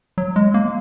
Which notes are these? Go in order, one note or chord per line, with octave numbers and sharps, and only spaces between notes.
F#3
G#3
A#3